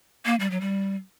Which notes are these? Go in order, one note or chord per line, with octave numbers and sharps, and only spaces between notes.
A#3
G3
F#3
G3